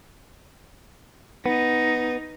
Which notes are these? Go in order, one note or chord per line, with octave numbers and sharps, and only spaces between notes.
B3 D#4